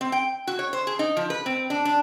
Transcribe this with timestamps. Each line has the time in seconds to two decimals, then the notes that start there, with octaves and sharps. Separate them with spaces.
0.01 C4
0.12 G5
0.47 F#4
0.59 C#5
0.73 C5
0.87 G#4
0.99 D#4
1.17 F3
1.30 B4
1.46 C4
1.70 D4
1.85 D4